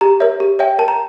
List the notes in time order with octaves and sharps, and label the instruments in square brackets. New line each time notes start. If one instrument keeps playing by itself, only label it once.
[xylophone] G4 A#5
A#4 C#5 E5
G4
C#5 E5 G5
A#4 A5
A#5